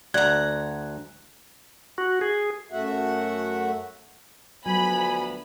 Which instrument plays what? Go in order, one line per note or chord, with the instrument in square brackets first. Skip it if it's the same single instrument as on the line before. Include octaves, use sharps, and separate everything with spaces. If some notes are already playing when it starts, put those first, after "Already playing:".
[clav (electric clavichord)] D2 [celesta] D5 G#6 [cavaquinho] F#5 A#5
[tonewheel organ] F#4
G#4
[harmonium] F#2 A3 F#4 E5 F#5
[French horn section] D2 F3 B3 [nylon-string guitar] F#3 [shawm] G#5 [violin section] B5